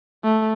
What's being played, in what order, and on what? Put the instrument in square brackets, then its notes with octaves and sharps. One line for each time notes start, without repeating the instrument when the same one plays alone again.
[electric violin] A3